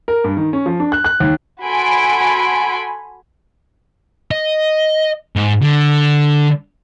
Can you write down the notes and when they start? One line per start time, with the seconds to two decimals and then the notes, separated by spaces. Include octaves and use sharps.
0.08 A#4
0.24 G2
0.37 D#3
0.53 C#4
0.66 F3
0.80 D4
0.92 F#6
1.04 F#6
1.20 D#2
1.63 F#4 A4 G#5 B5 C6 D7
4.31 D#5
5.36 G#2
5.61 D3